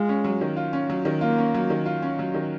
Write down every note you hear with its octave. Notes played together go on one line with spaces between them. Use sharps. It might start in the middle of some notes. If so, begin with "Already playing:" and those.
Already playing: G#3 F4
C#4
F#3
D#3
F4
C#4
F#3
D#3
A#3 F4
C#4
F#3
D#3
F4
C#4
F#3
D#3